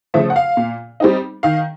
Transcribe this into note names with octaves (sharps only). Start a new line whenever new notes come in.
C#3 F3 A3 E5
F#5
F5
A#2
G3 C4 D#4
D#3 F5